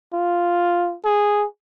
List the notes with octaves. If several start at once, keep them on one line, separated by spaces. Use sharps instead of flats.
F4
G#4